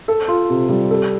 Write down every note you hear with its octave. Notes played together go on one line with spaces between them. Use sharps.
A4
F4
C3
G3
A4